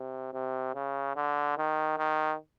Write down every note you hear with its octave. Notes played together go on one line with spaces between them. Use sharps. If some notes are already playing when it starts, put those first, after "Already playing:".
Already playing: C3
C3
C#3
D3
D#3
D#3